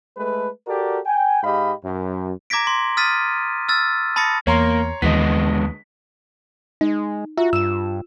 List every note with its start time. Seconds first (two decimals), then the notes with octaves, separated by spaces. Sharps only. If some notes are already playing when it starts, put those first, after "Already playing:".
0.18 G#3 A3 A4 B4
0.67 F#4 G4 A4 A#4 D5
1.06 G5 G#5
1.43 G#2 G4 D#5 F5 B5
1.84 F#2
2.50 A#5 D6 G#6 A#6 B6 D7
2.67 C6
2.97 D#6 F6 A6 B6 D#7
3.69 E6 F6 A6
4.16 A5 B5 D#6 A6 A#6 C#7
4.47 E2 A#3 C#5 A#5 C6
5.02 D#2 D3 E3 G#3 B3 D#5 B6
6.81 G#3 D#4
7.38 F4 F#4 E5
7.53 G2 E6 E7